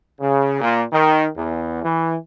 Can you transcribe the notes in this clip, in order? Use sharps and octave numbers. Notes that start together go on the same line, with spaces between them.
C#3
A#2
D#3
E2
E3